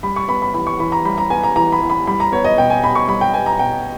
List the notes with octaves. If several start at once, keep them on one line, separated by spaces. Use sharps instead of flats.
G3 B5
C#6
B3 B5
B5
E3 B5
C#6
E3 B5
A#5
G3 B5
A#5
B3 G#5
A#5
E3 A#5
B5
E3
B5
G3 B5
A#5
B3 C#5
D#5
B2 G5
G#5
B2 B5
C#6
G3 B5
G5
B3 G#5
A#5
B2 G5